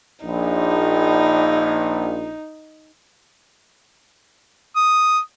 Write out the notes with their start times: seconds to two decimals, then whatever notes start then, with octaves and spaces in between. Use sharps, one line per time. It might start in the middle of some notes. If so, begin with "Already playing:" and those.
0.25 A#1 D#4
4.76 D#6